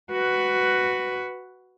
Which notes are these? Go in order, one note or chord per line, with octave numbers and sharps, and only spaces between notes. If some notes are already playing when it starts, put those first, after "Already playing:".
F#4 B4